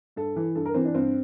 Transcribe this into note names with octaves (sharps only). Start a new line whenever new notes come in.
G2 A4
E3
G2 A4
A#4
E3 C4
D4
G2 C4